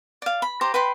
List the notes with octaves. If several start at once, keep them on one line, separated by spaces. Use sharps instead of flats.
D5 F5
B5
G4 C5 A#5 D6
B4 G5 B5 C6